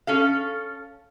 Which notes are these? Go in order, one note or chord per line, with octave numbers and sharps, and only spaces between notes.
C#4 A4 F5